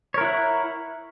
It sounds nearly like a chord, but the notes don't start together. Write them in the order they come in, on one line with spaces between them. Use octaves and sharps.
C#5 A#4 E4 F#5